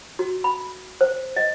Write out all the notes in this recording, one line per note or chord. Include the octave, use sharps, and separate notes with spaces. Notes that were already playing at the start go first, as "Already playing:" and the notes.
F#4
B5
C5
D#5